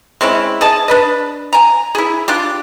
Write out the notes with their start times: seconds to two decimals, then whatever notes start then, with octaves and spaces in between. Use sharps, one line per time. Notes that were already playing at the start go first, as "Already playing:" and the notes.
0.21 G#3 C4 C#4 E4
0.61 G#4 D#5 A5
0.88 D4 B4 D#5
1.53 G#5 A#5
1.95 E4 G#4
2.28 D4 F4 G4